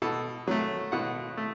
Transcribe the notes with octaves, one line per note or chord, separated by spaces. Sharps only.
B2 A4
F#3 A3
B2 F#5
A3